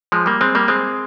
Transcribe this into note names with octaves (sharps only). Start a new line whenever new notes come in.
F3 G#3
G3 A#3
G#3 C4
G3 A#3
G#3 C4